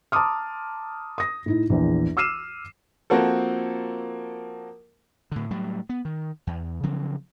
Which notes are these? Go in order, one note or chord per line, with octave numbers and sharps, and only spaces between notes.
A5 A#5 C6 D6 D#6 F6
D#6 A#6
A2 D#4 E4
A#1 E2
D6 E6 F6 C7 D#7 E7
F3 A#3 C4 F#4 A4
A2 D3
A2 F#3 G3
B3
D#3
E2
C#3 F3 F#3 C4